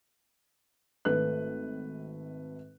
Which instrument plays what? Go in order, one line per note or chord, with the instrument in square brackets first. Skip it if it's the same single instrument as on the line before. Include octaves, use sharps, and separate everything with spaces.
[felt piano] G#1 A3 B4 F#6